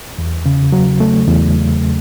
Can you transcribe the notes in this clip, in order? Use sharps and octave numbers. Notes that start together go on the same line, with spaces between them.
E2
C#3
F#3
A3
E2